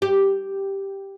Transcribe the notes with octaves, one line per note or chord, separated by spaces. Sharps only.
G4